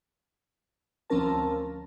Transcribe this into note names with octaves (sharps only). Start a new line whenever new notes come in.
D2 F3 C4 C#4 A#4 A5